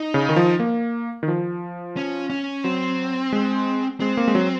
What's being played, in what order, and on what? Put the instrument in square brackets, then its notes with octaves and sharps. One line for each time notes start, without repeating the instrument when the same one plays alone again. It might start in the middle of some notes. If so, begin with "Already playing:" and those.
Already playing: [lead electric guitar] D#4
[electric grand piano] C#3
D#3
F3
A#3
D#3
F3
[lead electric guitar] C#4
C#4
[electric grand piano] F#3 [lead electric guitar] C4
[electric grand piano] G#3
[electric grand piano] G#3 [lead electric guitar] C4
[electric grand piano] A#3
G#3
F#3